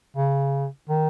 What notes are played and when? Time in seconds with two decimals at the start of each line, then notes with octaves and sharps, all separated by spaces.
0.17 C#3
0.89 D#3